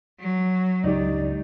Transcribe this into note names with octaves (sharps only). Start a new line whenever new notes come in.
F#3
C#2 G2 D#4 G4 D5